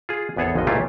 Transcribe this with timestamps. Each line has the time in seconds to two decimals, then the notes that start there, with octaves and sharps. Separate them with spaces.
0.09 F4 G#4
0.36 G#1 E2 B3 G#4 A4 C#5
0.55 G#1 F2 F3 F#4 D#5
0.67 C#2 A#2 A3 E4 F4 G4